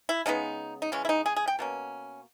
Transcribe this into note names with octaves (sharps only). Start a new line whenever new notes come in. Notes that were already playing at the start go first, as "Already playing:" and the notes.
E4
C#3 G#3 B3 D#4
D#4
C#3 E3 G#3 C#4
E4
D#4
G#4
G#4
G5
B2 A#3 C#4